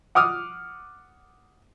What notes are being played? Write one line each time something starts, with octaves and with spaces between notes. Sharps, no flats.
F#5 D6 D#6 F6